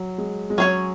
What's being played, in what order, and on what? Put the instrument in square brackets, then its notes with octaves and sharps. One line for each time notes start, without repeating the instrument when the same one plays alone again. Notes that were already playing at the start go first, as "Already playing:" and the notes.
Already playing: [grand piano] F#3
G#3
G#3
[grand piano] F#3 [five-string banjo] C#4 G#4 C#5